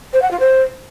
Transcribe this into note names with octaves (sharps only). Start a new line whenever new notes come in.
C5
F#5
F4
C5